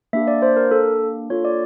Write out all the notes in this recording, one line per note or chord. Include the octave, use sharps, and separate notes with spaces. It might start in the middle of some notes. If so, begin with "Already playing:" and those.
A#3 D4 G4 E5
D5
C5
A#4
A4
A#3 D4 F4 A4 C#5
D5